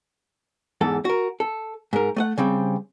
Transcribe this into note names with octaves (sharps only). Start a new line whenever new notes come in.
E2 G#2 A4
F#4 A#4
A4
G#2 A#4
A3 D#5 F#5
C#3 G3 C4